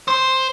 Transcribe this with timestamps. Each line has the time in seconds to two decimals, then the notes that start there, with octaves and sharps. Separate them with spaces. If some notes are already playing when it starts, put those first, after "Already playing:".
0.08 C5